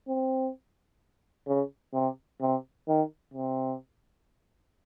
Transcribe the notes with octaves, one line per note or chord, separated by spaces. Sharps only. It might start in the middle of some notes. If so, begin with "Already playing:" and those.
C4
C#3
C3
C3
D#3
C3